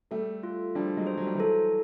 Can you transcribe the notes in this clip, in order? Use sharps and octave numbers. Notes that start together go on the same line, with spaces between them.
G3 A3 A4
F4
F3 G3 D4
F#3 G#3
C5
F#3
G3
E3 F#3 A4